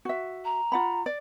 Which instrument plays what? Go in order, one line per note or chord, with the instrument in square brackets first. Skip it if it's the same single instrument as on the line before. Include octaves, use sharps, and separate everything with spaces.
[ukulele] F#4 E5
[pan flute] A#5
[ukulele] F4 F#5 B5
D5